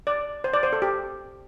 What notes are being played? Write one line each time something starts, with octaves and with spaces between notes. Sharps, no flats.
D5
C5
D5
C5
A4
G4